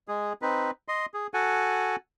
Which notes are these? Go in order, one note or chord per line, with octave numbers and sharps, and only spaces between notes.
G#3 G#4
C4 D#4 B4
D#5 C6
G#4
F#4 A4 F#5 G#5